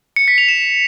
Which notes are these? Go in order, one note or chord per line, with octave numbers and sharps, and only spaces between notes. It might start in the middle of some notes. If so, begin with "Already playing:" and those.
C#7
B6
F7
E7